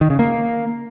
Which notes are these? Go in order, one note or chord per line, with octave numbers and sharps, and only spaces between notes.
D#3
C#3
A#3